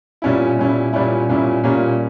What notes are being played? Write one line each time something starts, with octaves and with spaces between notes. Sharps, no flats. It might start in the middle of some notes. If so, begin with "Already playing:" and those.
A#2 G3 C#4 E4
A#2 G3 C#4 E4
A#2 G3 C#4 E4
A#2 G3 C#4 E4
A#2 G3 A#3 C#4